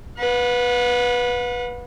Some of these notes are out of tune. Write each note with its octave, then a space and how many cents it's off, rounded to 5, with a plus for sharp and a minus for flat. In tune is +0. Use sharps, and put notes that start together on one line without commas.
B4 -10 F#5 -45